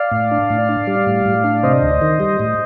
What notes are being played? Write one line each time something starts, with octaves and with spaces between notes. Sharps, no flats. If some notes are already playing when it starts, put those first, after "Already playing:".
Already playing: D5 F5
A2
D4
A2
D4
G3
A2
A2
D4
C3 C5 D#5
D2
D#3
G3
A2